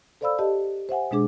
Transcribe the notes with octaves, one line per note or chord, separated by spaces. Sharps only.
A4 C5 D5 F5 B5 E6
G4 D#5 A5
C5 E5 F#5 G#5
B2 G#3 D4 G#4 D6